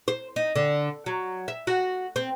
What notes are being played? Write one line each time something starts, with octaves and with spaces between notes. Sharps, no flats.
C5
D#4
D3
F#3
E5
F#4
C4